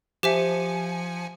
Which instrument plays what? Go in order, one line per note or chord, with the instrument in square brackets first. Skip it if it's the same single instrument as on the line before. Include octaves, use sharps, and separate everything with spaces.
[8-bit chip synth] F3 G#5 C#7 [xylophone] G4 C5 E5